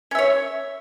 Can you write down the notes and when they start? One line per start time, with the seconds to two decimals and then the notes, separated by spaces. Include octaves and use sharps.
0.11 C#4
0.15 E5
0.19 C#5